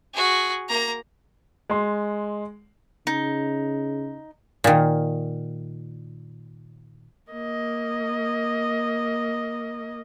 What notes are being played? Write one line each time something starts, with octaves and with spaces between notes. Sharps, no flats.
F#4 G#4
A#3 A#5
G#3 C6
C#3 D#4
A#2 D#3
A#3 D#5